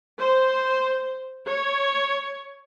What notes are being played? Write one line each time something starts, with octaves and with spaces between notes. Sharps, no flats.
C5
C#5